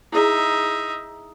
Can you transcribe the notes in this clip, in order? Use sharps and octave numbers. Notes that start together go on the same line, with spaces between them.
D#4 E4 G#4 E5